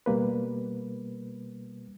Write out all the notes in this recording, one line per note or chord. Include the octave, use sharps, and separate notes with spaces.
B2 G3 A#3 B4